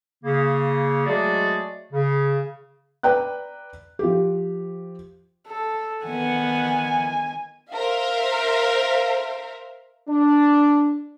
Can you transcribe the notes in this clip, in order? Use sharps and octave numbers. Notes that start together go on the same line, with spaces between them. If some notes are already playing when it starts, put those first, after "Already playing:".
C#3 A#3
F#3 G#3 A3 F#4 G#4 D5
C#3
B4 D5 G5 A#5 F#6
F3 G4
A4
D#3 B3 F#5 G#5
A#4 C5 E5 F5
D4